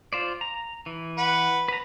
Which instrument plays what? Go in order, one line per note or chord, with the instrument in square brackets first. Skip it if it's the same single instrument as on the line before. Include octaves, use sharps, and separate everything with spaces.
[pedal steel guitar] F4 C5 D5
A#5
E3
[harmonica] B4 F#5
[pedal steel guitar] B4 A#5